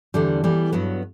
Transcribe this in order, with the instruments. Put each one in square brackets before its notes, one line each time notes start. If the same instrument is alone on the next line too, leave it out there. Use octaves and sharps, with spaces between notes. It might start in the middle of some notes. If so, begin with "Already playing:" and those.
[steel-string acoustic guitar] E2 D3 G3
E3 G3 B3
G2 F#3 B3